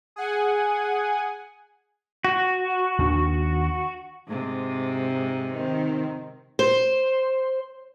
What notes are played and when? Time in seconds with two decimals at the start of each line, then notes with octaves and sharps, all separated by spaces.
0.16 G#4 F#5 G#5
2.25 F#4
2.98 D#2 D#3 D4
4.28 G#2 C3
5.50 D#3 C4
6.59 C5